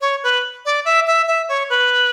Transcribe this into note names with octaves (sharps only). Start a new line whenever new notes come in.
C#5
B4
D5
E5
E5
E5
C#5
B4